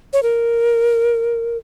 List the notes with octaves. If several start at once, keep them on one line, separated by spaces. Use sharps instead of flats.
C#5
A#4